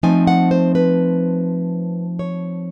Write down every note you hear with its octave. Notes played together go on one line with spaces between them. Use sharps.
F3 A3 C4 D#4 G#5
F#5
C5
B4
C#5